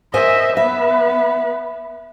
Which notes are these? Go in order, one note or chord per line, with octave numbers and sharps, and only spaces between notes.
A#4 C5 D#5 E5 G#5
B3 B4 E5